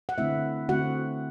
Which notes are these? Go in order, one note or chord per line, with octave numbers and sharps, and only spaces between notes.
F#5
D3 A3 C4 E4 E5
D3 A3 C4 F#4 F#5